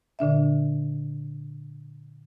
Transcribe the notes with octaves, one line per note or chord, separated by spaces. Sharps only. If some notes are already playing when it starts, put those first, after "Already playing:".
A#2 D3 D4 E5